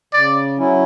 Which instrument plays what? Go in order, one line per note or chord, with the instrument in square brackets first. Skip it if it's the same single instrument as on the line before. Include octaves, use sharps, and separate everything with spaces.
[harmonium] C#3 [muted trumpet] D5
[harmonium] F#3 C#4 E4